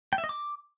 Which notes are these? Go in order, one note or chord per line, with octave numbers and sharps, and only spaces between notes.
G5
E5
D#5
D6